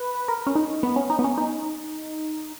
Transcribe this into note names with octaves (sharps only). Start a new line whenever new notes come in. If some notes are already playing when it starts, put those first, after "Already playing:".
Already playing: B4
A#4
C#4
D#4
B3
C#4
D#4
B3
C#4
D#4